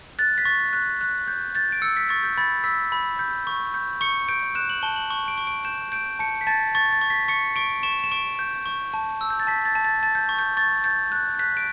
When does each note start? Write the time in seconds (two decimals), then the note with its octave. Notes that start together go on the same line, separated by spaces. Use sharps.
0.19 F#6 A6
0.38 B6
0.45 C#6 A6
0.73 F#6
1.01 F#6
1.28 G6
1.55 G6 A6
1.72 D7
1.82 E6 C#7
1.97 B6
2.09 C#6 A6
2.23 G6
2.38 B5 A6
2.64 E6 B6
2.92 B5
3.19 G6
3.47 C#6
3.74 G6
4.01 C#6 C#7
4.28 G6 D7
4.55 F#6 E7
4.70 F#7
4.83 A5 G7
4.96 F#7
5.10 C#6
5.28 D7
5.38 C#6
5.47 D7
5.65 G6 E7
5.92 G6 D7
6.19 A5 C#7
6.41 B6
6.47 A5 A6
6.75 C#6 A6
6.92 A6
7.01 C#6
7.10 B6
7.28 C#6 C#7
7.56 C#6 D7
7.83 C#6 E7
8.04 E7
8.12 C#6 D7
8.39 G6
8.66 C#6
8.94 A5
9.21 E6
9.30 G6
9.40 A6
9.47 A5 B6
9.65 A6
9.75 A5
9.85 A6
10.03 A5 A6
10.15 G6
10.29 C#6
10.39 G6
10.57 C#6 A6
10.84 G6 A6
11.12 F#6
11.39 F#6 B6
11.57 D7